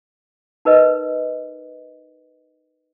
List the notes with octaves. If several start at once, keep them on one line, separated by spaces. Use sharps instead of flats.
D#4 A#4 B4 D#5